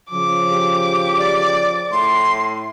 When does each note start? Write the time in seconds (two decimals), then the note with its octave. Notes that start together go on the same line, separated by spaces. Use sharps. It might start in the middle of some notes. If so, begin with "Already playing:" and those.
0.11 C#3 F3 D6
0.51 G4
1.18 D5
1.92 A2 C6